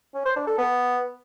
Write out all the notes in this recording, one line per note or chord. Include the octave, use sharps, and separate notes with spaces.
C#4
C5
D4
A4
B3